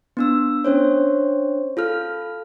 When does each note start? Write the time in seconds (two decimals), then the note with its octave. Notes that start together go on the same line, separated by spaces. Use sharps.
0.17 B3 D4 E6
0.64 C#4 D4 C5 C#5
1.77 F4 A4 F6